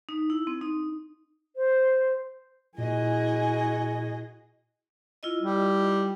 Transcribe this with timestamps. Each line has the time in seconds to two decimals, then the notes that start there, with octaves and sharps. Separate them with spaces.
0.09 D#4
0.30 E4
0.47 C4
0.61 D#4
1.55 C5
2.78 A#2 E4 F#4 G#4 D#5 G#5
5.23 E4 F4 D#5
5.42 G3